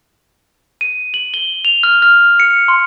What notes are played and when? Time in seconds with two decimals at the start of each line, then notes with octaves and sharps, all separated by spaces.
0.81 D#7
1.14 F#7
1.34 G7
1.65 F7
1.83 F6
2.02 F6
2.40 C#7
2.68 C6